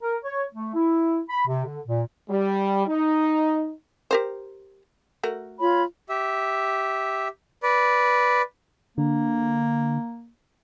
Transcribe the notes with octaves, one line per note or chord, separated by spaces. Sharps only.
A#4
C#5
A3
E4
B5
C3
D3
A#2
G3
D#4
G4 A#4 C5
A3 F#4 A#4
F4 C#5 B5
G4 E5
B4 D5
D3 A#3